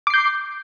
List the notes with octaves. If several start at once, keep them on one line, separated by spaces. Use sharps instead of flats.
D6 G6 C7